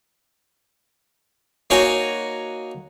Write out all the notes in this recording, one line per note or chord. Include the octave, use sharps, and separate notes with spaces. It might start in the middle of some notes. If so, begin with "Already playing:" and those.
A#3 D#4 F#4 C#5 G#5